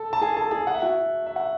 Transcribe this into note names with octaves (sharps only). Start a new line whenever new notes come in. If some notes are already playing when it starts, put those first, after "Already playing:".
Already playing: A4 A5
A5
G#4 G#5
A4 A5
G#4 G#5
F#5
E5
F#4 F#5
E5
F#5